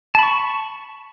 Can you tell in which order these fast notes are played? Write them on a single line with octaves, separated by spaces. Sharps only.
A5 B5 C#6